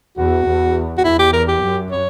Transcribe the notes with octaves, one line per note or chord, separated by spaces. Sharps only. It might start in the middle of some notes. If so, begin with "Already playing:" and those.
E2 F#4
E2
F#4
E2 E4
G4
A#4
G4
F#2
C#5